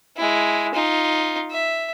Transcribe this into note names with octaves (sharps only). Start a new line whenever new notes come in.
G#3 E4
D#4 F4
E5